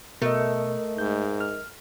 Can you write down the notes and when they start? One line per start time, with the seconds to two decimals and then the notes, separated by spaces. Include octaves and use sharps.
0.22 B2 A3 A#4 D#5
0.98 G#2 G6
1.40 F6